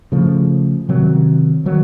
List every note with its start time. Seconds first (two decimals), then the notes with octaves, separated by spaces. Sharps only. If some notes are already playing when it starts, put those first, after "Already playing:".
0.12 C#3 F3 A3
0.89 C3 D#3 F#3 C4
1.66 D#3 F#3